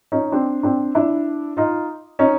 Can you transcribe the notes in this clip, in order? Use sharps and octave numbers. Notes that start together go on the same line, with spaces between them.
C#4 D#4
C4 D4
C4 D4
D4 E4
D#4 F4
C#4 D#4